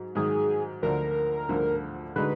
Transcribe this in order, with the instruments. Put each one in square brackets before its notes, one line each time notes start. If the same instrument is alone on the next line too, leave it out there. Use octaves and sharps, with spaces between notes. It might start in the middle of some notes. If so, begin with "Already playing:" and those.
Already playing: [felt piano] G#2 F#3
[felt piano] G#2 D#3 F#3 [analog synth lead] G#4
[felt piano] D2 D3 F3 [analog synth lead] A#4
[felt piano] D2 D3 F3
[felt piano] D3 G#3 D#4 F#4 [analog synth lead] B4